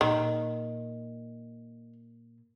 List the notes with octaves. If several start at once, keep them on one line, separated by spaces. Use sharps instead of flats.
A#2 D#3